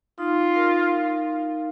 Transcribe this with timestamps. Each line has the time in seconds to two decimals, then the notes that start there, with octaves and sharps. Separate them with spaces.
0.18 D#4 F4
0.54 A#4 F5